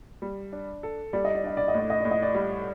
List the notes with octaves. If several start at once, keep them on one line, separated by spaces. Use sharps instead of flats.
G3
D4
A4
G3 D5
D#5
D5
D4 D#5
D5
D#5
A2 D5
D#5
A2 D5
D#5
D5
G3